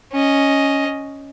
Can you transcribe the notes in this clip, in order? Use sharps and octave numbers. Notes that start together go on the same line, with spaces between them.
C#4 D#5